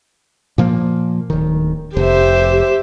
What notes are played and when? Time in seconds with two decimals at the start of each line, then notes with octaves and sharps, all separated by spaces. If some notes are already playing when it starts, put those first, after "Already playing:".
0.58 A#2 F3 A#3
1.30 D1 D#3
1.97 F1 G4 C5 E5